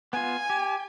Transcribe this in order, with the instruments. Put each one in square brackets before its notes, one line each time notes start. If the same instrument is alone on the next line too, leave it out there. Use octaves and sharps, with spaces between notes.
[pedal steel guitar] B3 F4 [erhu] G#5
[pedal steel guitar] G4